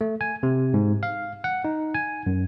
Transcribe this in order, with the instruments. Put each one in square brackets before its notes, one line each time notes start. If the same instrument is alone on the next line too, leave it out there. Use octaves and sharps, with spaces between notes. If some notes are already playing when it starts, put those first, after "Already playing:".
[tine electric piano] A3
G#5
C3
G#2
F5
F#5
D#4
G#5
F#2